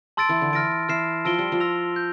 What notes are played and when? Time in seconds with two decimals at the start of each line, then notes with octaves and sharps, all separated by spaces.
0.17 A5 C6 E6 A6 D7
0.29 E3
0.41 D3
0.53 E3 F6 A#6 D7
0.89 E3 F6 C7 E7
1.25 F3 A5 E6 A#6 D7 G7
1.39 G3
1.52 F3
1.60 E6 A#6 F7
1.96 G6